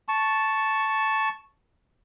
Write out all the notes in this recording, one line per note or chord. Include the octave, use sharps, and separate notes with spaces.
A5 C#6